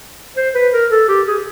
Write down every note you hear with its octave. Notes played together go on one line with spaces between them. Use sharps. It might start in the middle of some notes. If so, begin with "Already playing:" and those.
C5
B4
A#4
A4
G4
G#4